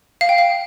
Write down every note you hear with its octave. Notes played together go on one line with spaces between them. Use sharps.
F5
G5
F5